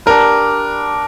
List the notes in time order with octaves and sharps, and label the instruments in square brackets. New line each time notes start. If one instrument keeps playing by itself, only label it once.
[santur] D4 G4 B4 [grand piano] A#4